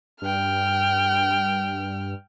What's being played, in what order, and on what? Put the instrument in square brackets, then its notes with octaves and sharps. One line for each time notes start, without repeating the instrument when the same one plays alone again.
[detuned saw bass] G2 [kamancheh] G5 F6